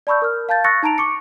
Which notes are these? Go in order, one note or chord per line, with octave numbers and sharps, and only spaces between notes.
D5 A5 B5 C#6 E6 G6
A#4 F6
F5 A5 G6 A6
C#6 E6 F#6 A6 A#6 C#7
D#4 A5 A#5 D7 F7
C#6 D6 C#7